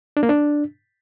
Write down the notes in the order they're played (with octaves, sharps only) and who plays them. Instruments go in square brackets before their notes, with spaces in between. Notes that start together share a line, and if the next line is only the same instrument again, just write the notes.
[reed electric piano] D4
A#3
D4